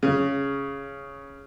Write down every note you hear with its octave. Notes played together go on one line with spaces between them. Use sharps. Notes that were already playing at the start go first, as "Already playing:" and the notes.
C#3